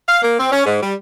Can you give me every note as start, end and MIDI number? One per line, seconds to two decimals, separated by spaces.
0.08 0.19 77
0.22 0.38 58
0.39 0.48 60
0.52 0.63 61
0.66 0.78 44
0.82 0.94 55